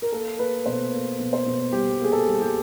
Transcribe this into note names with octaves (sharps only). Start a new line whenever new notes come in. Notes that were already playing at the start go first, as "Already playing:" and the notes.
A#4
A#3 A4
A#3 B4
B2 C5
A#3
B2
C5
B2
G3 G4
A#3
G#4
A4
G3
G4